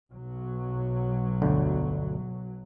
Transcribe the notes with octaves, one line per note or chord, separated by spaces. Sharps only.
B1 F#3
G1 D2 D3